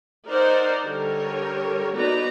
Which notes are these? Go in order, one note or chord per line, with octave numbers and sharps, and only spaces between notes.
D#4 A#4 C5 D5 F#5
D3 G3 A#4 C#5
B3 D#4 F#4 B4 D5 A#5